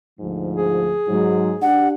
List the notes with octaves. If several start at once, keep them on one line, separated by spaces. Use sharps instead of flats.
D2 G#2 F3
G#4
G#2 F#3
D4 G4 F#5